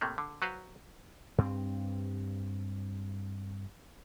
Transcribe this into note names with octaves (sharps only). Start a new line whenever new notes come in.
A2 C3 A3 A#3
D3
F#3 F#4 B4 C5 F5
G2 C4